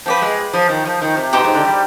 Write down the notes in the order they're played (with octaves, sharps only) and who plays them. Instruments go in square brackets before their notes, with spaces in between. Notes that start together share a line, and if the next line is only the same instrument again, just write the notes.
[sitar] F3 [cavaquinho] B4 D5 G5
[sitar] G#3
F3
D#3
F3
D#3
C3
[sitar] B2 [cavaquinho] D#4 G4 C5 G5
[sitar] G#2
D3
G3